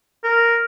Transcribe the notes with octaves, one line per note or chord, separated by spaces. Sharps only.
A#4